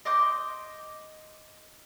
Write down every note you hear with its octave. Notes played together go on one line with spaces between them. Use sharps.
D#5 C6 D6 G6